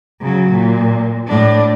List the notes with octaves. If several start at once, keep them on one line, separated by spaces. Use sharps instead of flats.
C#3 F#3
A#2
A2 D4